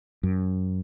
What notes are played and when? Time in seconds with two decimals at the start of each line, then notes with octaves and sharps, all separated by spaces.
0.23 F#2